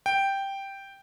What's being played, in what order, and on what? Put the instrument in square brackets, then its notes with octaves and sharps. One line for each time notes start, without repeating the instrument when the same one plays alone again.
[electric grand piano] G5